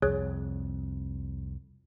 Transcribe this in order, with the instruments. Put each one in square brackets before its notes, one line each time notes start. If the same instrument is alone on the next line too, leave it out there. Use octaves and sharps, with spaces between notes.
[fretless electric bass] C2 F2 [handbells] G#4 C#5 F#6